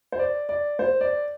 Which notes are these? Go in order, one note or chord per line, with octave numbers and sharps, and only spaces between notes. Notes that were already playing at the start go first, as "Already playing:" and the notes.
C5
D5
D5
C5
D5